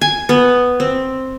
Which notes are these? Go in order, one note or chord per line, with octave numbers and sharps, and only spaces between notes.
G#5
B3
C4